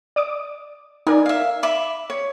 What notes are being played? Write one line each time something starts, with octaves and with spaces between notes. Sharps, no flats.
D5 D6 D#6
D#4 A#4 D5 G#5
E5 F5
E5 B5 D6
C#5